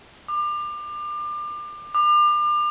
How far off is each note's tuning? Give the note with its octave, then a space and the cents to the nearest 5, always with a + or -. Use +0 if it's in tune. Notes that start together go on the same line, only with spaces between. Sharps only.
D6 +30
D6 +35